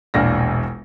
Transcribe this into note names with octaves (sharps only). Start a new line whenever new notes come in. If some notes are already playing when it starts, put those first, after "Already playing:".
E1 A#1 D4 F4 A#6